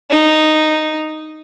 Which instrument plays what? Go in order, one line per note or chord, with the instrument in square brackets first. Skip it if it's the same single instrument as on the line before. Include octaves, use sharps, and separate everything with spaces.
[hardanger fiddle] D#4